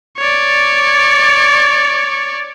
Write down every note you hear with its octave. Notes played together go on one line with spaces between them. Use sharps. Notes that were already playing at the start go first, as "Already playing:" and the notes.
C#5 D5